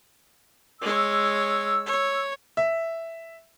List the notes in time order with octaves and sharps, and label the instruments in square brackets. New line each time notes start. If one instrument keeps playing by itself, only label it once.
[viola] G#3 C#5 [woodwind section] E6
[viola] C#5
[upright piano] E5